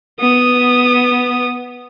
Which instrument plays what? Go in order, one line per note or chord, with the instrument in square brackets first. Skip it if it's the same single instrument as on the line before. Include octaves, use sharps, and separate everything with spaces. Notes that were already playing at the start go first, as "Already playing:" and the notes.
[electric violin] B3 D#6